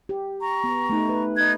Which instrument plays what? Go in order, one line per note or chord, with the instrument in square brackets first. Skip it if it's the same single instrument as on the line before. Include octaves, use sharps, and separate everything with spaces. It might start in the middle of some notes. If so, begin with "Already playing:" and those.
[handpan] G4
[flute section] A#5 C#6
[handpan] B3
A3 D#4
B4
[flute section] D#4 F#6 G#6